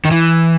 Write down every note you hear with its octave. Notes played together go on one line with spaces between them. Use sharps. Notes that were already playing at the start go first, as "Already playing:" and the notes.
D#3
E3